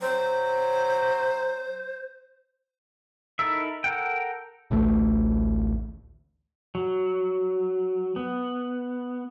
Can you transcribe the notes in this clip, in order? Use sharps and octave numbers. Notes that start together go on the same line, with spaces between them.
F#3 C5
D#4 E4 A4 A#4 E5
A4 A#4 F#5 G5
A1 D2 A3
F#3
B3